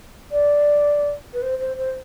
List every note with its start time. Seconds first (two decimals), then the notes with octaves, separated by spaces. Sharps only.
0.32 D5
1.34 B4
1.42 C5
1.60 C5
1.78 C5